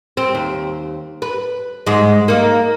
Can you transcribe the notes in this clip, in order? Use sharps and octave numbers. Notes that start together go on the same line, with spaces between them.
C4
D#2
B4
G#2 G#3
A#3 D#4